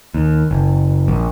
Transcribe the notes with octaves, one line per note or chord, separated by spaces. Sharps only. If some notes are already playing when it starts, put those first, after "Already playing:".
D#2
F#1
A#1